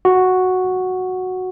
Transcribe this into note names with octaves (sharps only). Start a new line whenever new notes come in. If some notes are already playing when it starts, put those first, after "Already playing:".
F#4